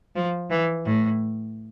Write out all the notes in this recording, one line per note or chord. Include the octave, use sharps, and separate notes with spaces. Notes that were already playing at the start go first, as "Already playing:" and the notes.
F3
E3
A2